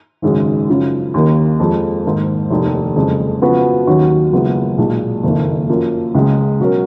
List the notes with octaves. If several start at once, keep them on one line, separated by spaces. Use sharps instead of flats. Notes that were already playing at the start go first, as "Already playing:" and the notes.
G#1 F#2 C#3 G#3
F#2 C#3 F3
D#2 D#3 A#3
F2 F3 G#3
G#2 D#3 A#3
F1 D#2 D#3
F#1 F2 C#3 G#3
C#3 F3 B3 F#4 B4
D#2 D#3 F#3 C#4 F#4
F#1 F#2 F3 G#3 B3
B1 A#2 G#3
F#1 F2 D#3 A#3
F#2 F3 A#3
C#2 C#3 G#3
B2 F#3 C#4 F#4 A#4